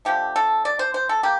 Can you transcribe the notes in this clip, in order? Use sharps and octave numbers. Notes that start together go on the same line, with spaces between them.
D3 F3 A3 G4
A4
D5
C5
C5
A4
A#3 G4